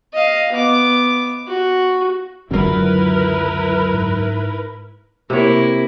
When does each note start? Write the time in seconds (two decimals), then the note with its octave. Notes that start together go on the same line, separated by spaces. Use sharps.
0.14 D#5 F5
0.53 B3 D6
1.47 F#4
2.51 C#2 F#2 D3 E3 F#3 E4 A#4 B4
3.94 G#2
5.30 C3 A#3 E4 C#5